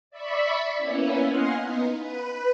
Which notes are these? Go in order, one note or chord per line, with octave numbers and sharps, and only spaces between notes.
D5 E5 B5 C#6
A#3 B3 C#4 E4
D#5 F5 F#5 G#5 C6
B3 D#4
B4